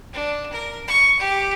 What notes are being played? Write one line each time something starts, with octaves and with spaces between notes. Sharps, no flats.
D4
A#4
C#6
G4